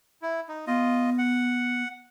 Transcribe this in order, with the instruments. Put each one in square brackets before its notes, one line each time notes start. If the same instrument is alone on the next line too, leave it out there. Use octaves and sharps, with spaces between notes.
[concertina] E4
D#4
[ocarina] B3 [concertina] F4 D#5
[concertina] F#5